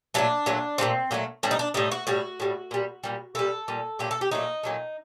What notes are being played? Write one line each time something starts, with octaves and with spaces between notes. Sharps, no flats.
A#2 F#3 A3 D4
A#2 F#3 A3
A#2 F#3 A3 C4
A#2 F#3 A3
A2 G3 D4
D#4
D4
A2 G3 D#4
F#4
A2 G3 F#4
A2 G3
A#2 G3
A#2 G3
A#2 G3 A4
A#2 G3
A#2 F#3 A3 G4
A4
G4
A#2 F#3 A3 D#4
A#2 F#3 A3